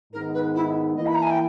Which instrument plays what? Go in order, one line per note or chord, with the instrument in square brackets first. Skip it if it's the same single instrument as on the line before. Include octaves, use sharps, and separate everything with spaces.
[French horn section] G#2 D#3 G#3 B3 D#4 [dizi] A#4
[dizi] B4
E4
[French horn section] E3 A#3 E4 [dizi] D#5
[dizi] B5
A#5
G#5
G5